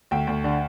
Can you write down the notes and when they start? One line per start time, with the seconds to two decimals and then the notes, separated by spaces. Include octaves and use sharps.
0.11 D2 G5
0.27 D2
0.44 D3